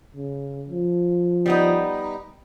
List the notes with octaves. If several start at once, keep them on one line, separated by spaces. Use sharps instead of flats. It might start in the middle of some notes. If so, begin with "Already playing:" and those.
C#3
F3
G3 B3 D#4